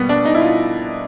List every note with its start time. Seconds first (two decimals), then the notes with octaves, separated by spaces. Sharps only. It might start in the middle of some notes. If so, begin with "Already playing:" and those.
Already playing: B2 G3 A#3 B3
0.09 D4
0.25 D#4
0.34 E4
0.41 F4